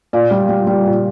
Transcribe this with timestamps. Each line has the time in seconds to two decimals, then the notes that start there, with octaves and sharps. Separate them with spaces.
0.13 A#2 D5
0.31 G3
0.49 G3
0.67 G3
0.86 A#2